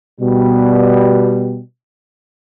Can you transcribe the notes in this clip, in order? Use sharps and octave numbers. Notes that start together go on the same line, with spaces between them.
B2 G3